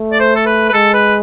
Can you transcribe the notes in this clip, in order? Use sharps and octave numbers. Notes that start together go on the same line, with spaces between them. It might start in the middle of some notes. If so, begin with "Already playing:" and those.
Already playing: A3
D5
C5
A4
B4
B4
G#3 A4
B4